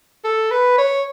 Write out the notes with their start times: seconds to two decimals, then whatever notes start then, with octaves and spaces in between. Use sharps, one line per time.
0.24 A4
0.51 B4
0.78 C#5